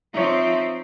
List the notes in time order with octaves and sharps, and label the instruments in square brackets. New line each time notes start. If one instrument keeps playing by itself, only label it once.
[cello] F3 C4 [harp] D#4 C#5 [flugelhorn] E5